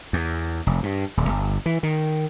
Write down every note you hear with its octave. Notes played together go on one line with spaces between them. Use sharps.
E2
F1
G2
D#1
G1
E3
D#3